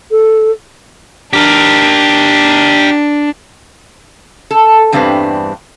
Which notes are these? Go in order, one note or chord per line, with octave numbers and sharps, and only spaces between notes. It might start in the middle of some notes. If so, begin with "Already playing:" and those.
A4
D4 G4 A#4
A4
E2 G2 G3 C4 D4 B4